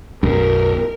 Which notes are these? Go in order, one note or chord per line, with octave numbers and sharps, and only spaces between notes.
B1 F#2 A#4